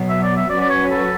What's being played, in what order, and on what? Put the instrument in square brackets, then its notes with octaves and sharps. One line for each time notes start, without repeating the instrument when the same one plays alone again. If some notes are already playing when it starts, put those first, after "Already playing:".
Already playing: [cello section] B2 F#3 B3
[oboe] E5
D5
E5
[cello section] F#3 C#4 F#4 B4 [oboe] D5
[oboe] D5
C#5
A4